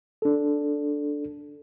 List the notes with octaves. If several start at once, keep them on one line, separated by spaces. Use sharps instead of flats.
D4 A4